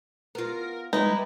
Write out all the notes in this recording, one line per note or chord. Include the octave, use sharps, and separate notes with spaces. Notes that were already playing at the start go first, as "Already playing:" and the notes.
B3 F4 A#4
G#3 D#4 E4 B4
G3